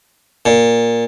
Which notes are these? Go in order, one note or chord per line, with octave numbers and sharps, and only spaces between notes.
A#2